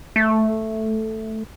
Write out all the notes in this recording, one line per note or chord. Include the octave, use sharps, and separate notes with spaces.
A3